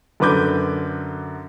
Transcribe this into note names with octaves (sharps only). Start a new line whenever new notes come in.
F#2 D3 B4 D6 G6